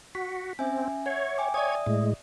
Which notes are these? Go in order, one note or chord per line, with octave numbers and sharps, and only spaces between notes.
F#4 B6
C4 C#4 E5 G#5
C#5 E5 F#5
G5 G#5 D6
C#5 D5 E5 D#6 G#6
A2 G#3